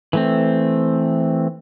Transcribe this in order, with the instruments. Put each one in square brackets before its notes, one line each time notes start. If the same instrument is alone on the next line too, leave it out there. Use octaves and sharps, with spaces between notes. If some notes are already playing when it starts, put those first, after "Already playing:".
[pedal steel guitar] E3 A3 C4